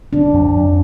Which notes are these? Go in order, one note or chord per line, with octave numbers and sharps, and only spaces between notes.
D3 D4
F2
F2